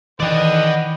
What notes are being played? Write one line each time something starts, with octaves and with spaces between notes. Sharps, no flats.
D#3 E3 B4 D5 D#5 F#5 G5